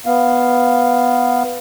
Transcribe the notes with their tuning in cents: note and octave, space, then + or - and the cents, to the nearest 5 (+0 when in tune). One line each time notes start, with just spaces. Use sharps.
B3 +0 F5 +0